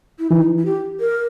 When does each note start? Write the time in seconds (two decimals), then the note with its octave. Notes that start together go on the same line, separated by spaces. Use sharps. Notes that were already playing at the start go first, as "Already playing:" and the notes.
0.19 E4
0.30 E3 D#4
0.58 E4
0.65 G4
1.00 A#4